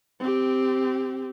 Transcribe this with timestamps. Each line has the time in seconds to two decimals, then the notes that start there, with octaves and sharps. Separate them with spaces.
0.20 C4 G4